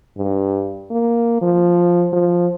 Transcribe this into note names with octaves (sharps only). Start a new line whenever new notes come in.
G2
A#3
F3
F3